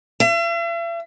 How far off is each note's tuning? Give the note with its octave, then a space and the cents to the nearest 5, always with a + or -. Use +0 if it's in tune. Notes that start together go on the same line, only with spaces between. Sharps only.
E5 +45